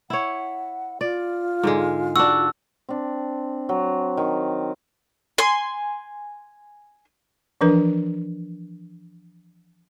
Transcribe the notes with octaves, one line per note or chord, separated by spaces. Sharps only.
E4 C#5 F#5
F4 D5
G#2 D3 G#3
D4 F#4 E6
C4 D4
F#3
D#3
G#5 C6
E3 F3 D4 A#4 B4